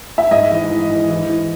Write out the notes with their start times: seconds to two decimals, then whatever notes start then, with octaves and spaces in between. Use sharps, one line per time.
0.18 E5
0.31 G#2 D#5
0.51 E3
0.70 E3
0.90 E3
1.10 E3
1.29 E3